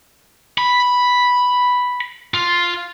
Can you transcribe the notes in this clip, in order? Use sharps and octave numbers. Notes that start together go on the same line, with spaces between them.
B5
F4